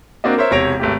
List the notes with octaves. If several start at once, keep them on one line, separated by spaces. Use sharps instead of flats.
A#3 C4 D4 F#4 D#5
A#4 C5 C#5 E5
E1 C3 C#5 A#6 D7 F7
G#1 A3 G4